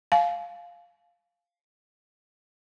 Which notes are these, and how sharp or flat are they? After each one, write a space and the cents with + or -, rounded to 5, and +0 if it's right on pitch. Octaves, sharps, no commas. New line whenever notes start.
F5 +0 G#5 +40